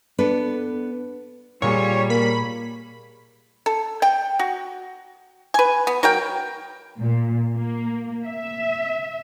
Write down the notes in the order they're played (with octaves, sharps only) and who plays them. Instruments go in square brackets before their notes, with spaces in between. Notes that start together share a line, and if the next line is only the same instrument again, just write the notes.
[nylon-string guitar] B3 D4 A4 B4
[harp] A#2 G#4 [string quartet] G3 [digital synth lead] C#5
[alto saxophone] A#3 [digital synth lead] B5
[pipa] A4
G5
F#4
B4 G#5
B3
F#3 A#4 G5
[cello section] A#2
A#3
E5